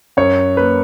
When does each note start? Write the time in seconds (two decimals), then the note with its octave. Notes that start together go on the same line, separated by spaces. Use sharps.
0.17 F#2 C#5
0.57 A#3 B4